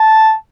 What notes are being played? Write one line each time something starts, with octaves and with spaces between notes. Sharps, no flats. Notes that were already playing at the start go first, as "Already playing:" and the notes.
Already playing: A5